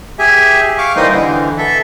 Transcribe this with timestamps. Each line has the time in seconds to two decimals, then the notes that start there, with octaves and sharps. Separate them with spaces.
0.19 G4 G#4 E5 G#5
0.78 F5 C#6 D6
0.96 E3 G3 A#3 D#4 C5 D#5
1.12 D3 E3
1.58 A4 E5